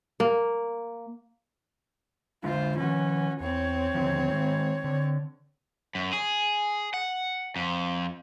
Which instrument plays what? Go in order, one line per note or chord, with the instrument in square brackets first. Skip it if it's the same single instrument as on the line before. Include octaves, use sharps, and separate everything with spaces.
[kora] A#3
[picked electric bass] D3 G#3 D4 [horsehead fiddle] F4 C5
[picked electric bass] D#3 F3 [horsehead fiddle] C#4 F#4
[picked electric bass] E2 [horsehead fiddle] C4 C#5
[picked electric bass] D#2 D3 F3
D#3 G#3
D3
[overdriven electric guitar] F#2
G#4
F#5
F2